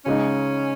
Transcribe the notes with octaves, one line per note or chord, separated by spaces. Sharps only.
C#3 G#3 C#4 D#4